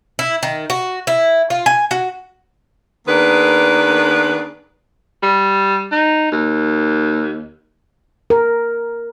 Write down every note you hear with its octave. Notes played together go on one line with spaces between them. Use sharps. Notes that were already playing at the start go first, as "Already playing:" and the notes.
E4
D#3
F#4
E4
F4
G#5
F#4
D#3 A#3 B3 D4 G#4 B4
G3
D#4
D#2
A#4